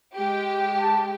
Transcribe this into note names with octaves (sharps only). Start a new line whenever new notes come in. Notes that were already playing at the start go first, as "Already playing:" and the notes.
G#3 G4
A5